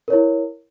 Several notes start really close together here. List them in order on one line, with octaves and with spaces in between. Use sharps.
A#4 C#5 E4